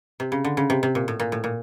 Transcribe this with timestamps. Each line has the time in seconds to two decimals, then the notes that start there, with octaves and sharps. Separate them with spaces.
0.20 C3
0.32 C#3
0.44 D3
0.57 C#3
0.70 C3
0.83 C3
0.95 A#2
1.08 A2
1.20 A#2
1.32 A2
1.44 A#2